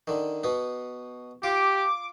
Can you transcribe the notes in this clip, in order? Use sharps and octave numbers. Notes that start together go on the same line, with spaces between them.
D3 D#3
B2 B3
F4 G4 D6